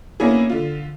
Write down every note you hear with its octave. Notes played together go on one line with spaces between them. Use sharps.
A#3 B3 C#4 D4 E4 G#4
D3 F4